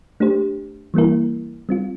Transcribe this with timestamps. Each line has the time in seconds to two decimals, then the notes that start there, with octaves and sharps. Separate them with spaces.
0.20 A3 D4 G4 C5
0.94 E3 G3 A#3 E4 A#4
1.69 G3 C4 F4